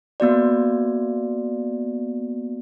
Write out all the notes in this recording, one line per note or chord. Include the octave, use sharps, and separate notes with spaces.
A#3 B3 F#4 D5